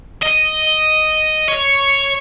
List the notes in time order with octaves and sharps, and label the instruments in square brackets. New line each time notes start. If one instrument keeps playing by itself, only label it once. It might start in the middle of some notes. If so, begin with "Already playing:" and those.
[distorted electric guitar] D#5
C#5